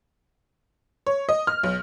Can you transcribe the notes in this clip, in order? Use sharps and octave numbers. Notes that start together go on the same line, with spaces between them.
C#5
D#5
F6
B1